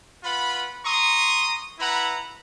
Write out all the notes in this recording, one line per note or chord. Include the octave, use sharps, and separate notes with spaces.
F4 B4 F#5 B5
A#5 C6 C#6 D#6
E4 B4 F#5 A#5 B5